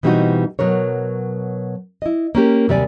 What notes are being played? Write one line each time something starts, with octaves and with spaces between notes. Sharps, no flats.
B2 E3 G3 C4 D#4 F#4
B2 F#3 A#4 C#5
E4 D#5
A#3 C#4 G4
D#2 C3 G3 D5 G#5